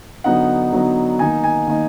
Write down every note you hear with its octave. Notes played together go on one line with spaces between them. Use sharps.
D3 F#3 B3 D#4 F#5
D3 F#3 B3 D#4
D#3 A#3 D#4 G#5
G#5
D#3 A#3 D#4